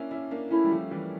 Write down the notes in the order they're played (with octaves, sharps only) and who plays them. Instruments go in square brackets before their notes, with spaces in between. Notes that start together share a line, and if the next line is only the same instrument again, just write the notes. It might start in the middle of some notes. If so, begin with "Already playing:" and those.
Already playing: [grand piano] A#3 C#4 D4 E4
C#4 E4
A#3 D4
[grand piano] A3 C#4 [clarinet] E4
[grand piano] G3
F3 A3
E3 G3